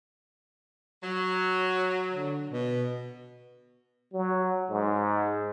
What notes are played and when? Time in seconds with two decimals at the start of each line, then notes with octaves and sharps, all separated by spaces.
1.03 F#3
2.11 D3
2.50 B2
4.13 F#3
4.70 G#2